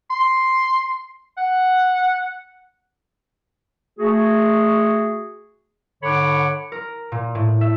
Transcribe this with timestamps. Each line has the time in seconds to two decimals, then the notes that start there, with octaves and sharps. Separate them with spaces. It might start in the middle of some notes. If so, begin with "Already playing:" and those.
0.10 C6
1.38 F#5
3.99 A3 F#4 G#4
6.03 G#2 D3 C#5 F#5 B5 D6
6.72 A#4
7.12 A#2
7.35 A2
7.61 E5